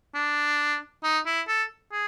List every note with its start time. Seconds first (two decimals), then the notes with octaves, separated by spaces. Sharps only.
0.15 D4
1.04 D#4
1.26 E4
1.48 A4
1.92 G#4